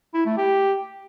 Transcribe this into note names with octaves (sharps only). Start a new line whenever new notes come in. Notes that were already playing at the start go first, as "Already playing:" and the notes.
E4
A3
G4